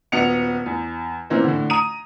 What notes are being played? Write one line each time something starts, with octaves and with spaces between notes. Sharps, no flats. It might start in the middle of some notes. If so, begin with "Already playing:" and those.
D#1 B3 F#4 C#7 F7
E2
E3 A#3 C4 C#4
A2 D3
A#5 D#6 D#7